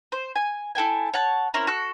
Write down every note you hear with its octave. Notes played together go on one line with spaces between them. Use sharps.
C5
G#5
E4 A4 G5 G#5
C#5 F#5 A5
C4 C#4 E4 A#4
F#4 A4 F#6